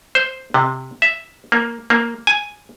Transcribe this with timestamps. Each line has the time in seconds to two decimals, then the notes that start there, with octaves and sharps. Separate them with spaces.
0.15 C5
0.54 C3
1.02 E5
1.52 A#3
1.90 A#3
2.27 G#5